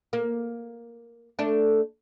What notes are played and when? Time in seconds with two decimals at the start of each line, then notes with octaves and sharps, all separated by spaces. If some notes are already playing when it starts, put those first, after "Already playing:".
0.13 A#3
1.39 A3 D4